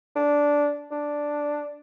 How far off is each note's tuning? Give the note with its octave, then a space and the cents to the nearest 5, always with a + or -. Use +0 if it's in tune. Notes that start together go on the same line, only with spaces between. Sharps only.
D4 -10
D4 +0